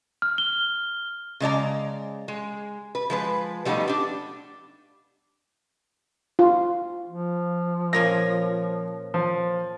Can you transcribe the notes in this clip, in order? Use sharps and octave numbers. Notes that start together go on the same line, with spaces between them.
F6
G7
C#3 G#3 D5 A#5
G#3
B4
F3 G#3 B4
F3 G3 A3 B3 D#4
D4 G4
F4
F3
A#2 A#3 C#4 A#6
F3